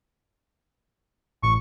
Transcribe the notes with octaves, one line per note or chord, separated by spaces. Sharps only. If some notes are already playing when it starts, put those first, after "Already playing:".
A1 C#6